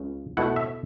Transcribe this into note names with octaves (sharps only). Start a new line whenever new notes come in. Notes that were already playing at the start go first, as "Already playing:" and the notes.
Already playing: C#2 C#3
B2 A3 E4 F#5
E5